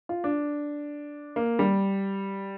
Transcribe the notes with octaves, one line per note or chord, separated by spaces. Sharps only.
F4
D4
A#3
G3